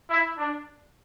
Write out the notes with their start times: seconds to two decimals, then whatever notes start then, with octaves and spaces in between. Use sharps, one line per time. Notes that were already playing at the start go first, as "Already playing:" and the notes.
0.09 E4
0.37 D4